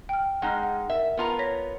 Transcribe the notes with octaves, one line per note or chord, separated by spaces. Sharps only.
G5 F6
G#3 D#4 F#5 A#5 F6
F#5
A#4 E5
B3 F4 A#4 A#5
C#5 A#6 B6